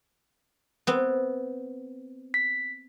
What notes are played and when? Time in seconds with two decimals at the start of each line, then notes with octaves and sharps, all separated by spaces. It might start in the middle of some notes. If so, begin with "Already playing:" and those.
0.87 B3 C4
2.34 B6